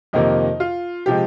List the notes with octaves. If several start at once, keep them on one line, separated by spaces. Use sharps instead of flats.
F2 C3 D#3 A#3 D#4
F4
C3 F3 G#3 G4